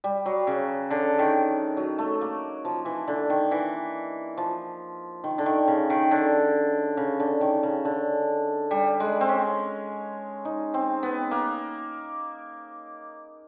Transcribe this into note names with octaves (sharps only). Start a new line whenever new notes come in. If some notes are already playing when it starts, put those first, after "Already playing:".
G3
F#3
C#3
D3
D#3
F#3
A3
A#3
F3
E3
D3
D#3
E3
F3
D#3
D3
D#3
C#3
D#3
D3
C#3
D3
D#3
C#3
D3
G3
G#3
C4
C#4
D#4
C4
B3
A#3